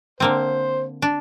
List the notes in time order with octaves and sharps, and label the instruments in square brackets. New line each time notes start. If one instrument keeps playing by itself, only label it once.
[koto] D3 A#3 C4 [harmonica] C5
[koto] D4